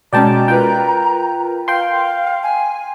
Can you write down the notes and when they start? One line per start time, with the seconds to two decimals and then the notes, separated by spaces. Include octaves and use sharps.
0.13 B2 G#3 C#4 D5 G5 A5 A#5
0.48 F4 A#4 B4 G5
1.68 F5 G5 C6
2.43 G#5